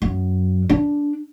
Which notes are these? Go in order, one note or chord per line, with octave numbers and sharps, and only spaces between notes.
F#2
D4